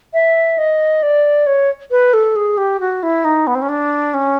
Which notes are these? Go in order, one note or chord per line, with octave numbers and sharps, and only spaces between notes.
E5
D#5
D5
C#5
B4
A4
G#4
G4
F#4
E4
D#4
B3
C4
C#4
D4
C#4